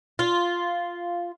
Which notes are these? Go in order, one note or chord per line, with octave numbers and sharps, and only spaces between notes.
F4